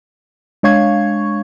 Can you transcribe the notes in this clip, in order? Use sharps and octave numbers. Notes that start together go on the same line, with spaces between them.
G#3 D4 C#5 F5 C#6 G#6